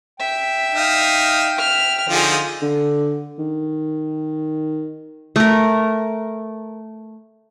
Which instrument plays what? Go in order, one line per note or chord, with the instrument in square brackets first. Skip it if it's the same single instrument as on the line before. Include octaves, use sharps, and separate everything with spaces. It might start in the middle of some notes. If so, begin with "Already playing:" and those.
[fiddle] E5 [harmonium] G5
[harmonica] D#4 F5
[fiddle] E5 F6
[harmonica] D3 F3 D#4 [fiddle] F4 G#4
[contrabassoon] D3
D#3
[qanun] A3 A#4